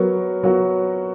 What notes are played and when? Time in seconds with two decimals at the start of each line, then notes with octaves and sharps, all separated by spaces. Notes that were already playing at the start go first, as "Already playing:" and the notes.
Already playing: F#3 B3 F#4 A#4
0.43 F#3 B3 F#4 A#4